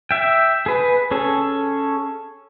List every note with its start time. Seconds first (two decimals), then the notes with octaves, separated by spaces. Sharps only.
0.11 E5 G5
0.66 G#4 B4
1.11 C#4 G#4 A4